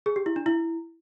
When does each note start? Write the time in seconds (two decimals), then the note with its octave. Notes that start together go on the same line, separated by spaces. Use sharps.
0.06 G#4
0.16 G4
0.26 E4
0.36 D4
0.46 E4